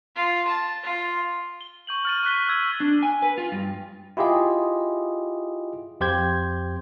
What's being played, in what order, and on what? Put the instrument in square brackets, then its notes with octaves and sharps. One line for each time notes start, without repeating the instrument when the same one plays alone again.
[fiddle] F4
A5
F4
[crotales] G7
C#6 G6 F#7
F6 A6 D#7
C#6 F#6 B6 G7
E6 G#6 A6 D#7
[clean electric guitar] D4
G#5
B4
F4
G2
[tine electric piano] E4 F4 G4 G#4 D#5
F2 G4 C5 G6 G#6